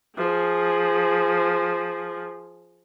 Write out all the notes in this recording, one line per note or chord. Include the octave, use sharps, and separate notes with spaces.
F3 G#4